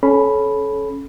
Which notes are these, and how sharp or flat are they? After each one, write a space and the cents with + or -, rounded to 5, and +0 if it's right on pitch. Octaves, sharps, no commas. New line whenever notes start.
C#4 +0 A4 -35 B5 +0